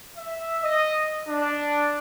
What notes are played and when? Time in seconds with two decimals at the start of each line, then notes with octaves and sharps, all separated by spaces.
0.18 E5
0.63 D#5
1.27 D4